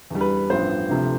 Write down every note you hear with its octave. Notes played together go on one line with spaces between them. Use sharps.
E2 D3 G3
B4
A1 G2 F3 B3 C5
D2 C3 F3 A3